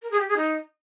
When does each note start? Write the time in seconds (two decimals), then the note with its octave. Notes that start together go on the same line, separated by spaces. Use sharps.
0.02 A#4
0.11 G#4
0.19 G4
0.28 G#4
0.37 D#4